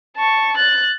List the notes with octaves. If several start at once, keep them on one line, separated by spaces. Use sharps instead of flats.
A5 C#6
F#6 A6